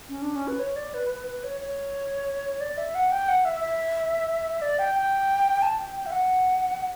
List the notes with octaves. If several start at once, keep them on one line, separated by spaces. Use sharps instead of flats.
C#4
D4
C#4
B4
C#5
D5
B4
B4
B4
C#5
C#5
D5
E5
F#5
G5
F#5
E5
E5
D5
G5
G5
A5
G5
G5
E5
F#5